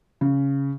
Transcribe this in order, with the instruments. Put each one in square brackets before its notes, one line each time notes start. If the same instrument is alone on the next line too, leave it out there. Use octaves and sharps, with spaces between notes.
[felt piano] C#3